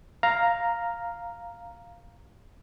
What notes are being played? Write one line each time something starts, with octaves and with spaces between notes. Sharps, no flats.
F5 A#5